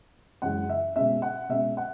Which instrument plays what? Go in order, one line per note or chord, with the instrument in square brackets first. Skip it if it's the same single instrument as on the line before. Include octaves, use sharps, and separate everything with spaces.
[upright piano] F#2 C#3 E3 G#3 F#5
E5
B2 G#3 C#4 E5
F#5
B2 G#3 C#4 E5
F#5